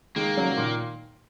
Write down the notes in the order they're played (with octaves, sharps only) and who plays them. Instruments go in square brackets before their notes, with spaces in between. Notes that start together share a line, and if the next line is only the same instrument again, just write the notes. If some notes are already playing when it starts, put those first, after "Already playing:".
[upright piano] D#3 G#3 [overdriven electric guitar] A#3
[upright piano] C#3 F#3
F#3
A#2 D#3